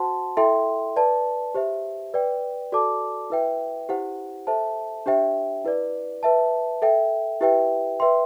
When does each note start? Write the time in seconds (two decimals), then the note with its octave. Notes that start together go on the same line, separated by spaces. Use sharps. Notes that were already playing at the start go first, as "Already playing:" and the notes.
Already playing: F#4 C5 F#5 A5 C6
0.37 E4 A4 E5 G5 C6
0.96 B4 D5 A5
1.55 G4 C5 E5
2.14 B4 D5 G5
2.72 F#4 A4 D5 A5 D6
3.30 E4 B4 E5 G5
3.89 E4 G4 C5 F#5
4.47 A4 C5 E5 A5
5.06 D4 G4 C5 E5 G5
5.65 E4 B4 D5
6.23 B4 E5 A5
6.82 A4 E5 G5
7.41 E4 G4 B4 E5 G5
8.00 B4 E5 G5 C6